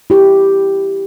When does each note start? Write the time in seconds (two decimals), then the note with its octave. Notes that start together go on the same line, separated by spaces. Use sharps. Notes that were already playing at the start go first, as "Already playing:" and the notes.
0.10 E4 G4